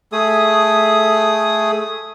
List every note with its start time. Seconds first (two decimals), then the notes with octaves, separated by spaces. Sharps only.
0.12 A3 G#4 D#6